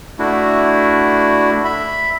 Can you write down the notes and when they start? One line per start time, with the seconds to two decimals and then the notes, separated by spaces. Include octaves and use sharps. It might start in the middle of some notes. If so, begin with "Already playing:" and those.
0.19 A3 D4 E4 F#4
1.65 E5 B5